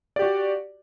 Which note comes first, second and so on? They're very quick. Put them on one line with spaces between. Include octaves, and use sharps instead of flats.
D5 G4 F#4